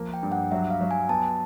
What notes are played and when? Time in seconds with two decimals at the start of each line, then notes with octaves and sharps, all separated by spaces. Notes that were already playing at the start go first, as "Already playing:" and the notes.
Already playing: F3 A#3
0.14 G5
0.23 G2
0.32 F#5
0.52 F#3 E5
0.70 F5
0.81 F#3
0.91 G#5
1.09 B3 A5